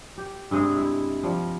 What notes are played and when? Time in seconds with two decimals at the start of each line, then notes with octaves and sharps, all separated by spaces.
0.18 G4
0.51 G2 C3 G#3 G#4
0.77 E4
1.23 F3 G3